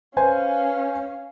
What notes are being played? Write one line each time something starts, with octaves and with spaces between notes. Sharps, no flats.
C#4 B4 C5 F5 G#5